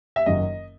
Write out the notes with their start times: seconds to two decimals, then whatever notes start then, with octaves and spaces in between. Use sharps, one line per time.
0.16 E5
0.26 F#1 F#2 D#3 F#3 D#5